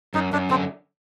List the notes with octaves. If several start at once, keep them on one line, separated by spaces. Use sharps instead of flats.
F#2 D#4
F#2 D4
D3 C4